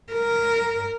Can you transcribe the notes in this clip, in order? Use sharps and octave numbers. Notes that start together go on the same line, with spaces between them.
A#4